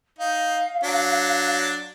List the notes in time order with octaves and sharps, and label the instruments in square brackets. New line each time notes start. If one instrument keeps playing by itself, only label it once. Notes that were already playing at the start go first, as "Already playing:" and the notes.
[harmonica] D#4 [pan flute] F5
[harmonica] F#3 D4